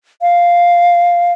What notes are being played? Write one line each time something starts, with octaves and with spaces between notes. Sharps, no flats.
F5